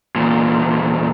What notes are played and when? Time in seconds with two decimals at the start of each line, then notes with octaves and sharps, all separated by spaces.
0.16 E2 A#2